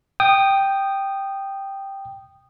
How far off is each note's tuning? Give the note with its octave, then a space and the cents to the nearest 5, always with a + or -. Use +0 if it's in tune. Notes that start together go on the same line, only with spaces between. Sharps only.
G5 +0 D#6 -15